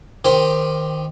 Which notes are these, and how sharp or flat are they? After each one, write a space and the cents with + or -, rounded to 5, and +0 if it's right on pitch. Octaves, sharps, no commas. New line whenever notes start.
D#3 +0 G4 +15 C5 +0